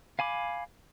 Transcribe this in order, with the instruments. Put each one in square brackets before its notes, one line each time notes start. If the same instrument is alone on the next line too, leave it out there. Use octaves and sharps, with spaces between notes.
[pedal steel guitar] F5 G#5 B5 D6